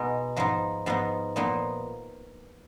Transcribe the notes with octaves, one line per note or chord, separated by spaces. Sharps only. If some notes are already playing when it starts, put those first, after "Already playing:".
Already playing: B2 G#3 B3 D#4
G#2 F3 B3 D#4
G#2 F3 B3 D#4
A#2 F3 B3 D#4